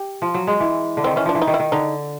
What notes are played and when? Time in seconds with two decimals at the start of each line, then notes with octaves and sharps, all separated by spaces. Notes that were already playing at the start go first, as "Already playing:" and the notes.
Already playing: G4
0.22 F3
0.34 F#3
0.47 G#3
0.60 E3
0.97 D3
1.04 D#3 C4
1.16 E3 C#4
1.25 F3 D4
1.35 E3
1.42 D#4
1.47 D#3
1.54 E4
1.59 D#3
1.72 D3 D#4